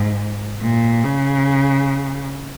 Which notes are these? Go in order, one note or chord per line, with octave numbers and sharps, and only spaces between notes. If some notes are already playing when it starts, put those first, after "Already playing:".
Already playing: G#2
A#2
C#3